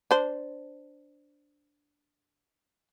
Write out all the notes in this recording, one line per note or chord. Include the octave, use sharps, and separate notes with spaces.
D4 C5